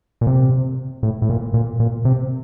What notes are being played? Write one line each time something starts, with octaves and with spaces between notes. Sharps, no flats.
A#2
C3
A2
A2
A#2
A#2
A#2
C3